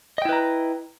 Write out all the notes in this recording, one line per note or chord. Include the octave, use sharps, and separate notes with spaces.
E4 B4 D#5 G5 A#5